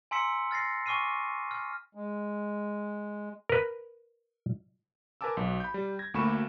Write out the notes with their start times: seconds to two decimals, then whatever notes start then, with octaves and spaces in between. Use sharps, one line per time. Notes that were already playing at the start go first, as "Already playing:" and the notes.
0.11 G#5 A#5 C6 E6 B6 C#7
0.51 F6 A6 A#6 C7
0.86 G#5 C#6 D6 F6 C7 D#7
1.51 F6
1.95 G#3
3.49 A#4 B4
5.21 A#4 B4 G#5 A5 D6 E6
5.37 B1
5.60 B5 G6
5.74 G3
5.99 G#6 A#6
6.14 D2 A3 A#3 B5 C#6 E7